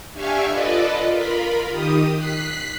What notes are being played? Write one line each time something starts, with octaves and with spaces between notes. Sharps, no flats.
D4 G4 E5 F5 G#5 C#6
F4 A4 B4 D5 D#5
F4 A#4 B5
D#3 G4 D#6
F#6 B6 C7